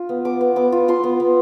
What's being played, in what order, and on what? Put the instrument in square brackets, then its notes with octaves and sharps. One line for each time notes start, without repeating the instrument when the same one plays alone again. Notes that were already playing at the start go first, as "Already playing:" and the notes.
Already playing: [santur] F4
B3
B3 D6
B3
B3 D6
F4
F4 C6
B3
B3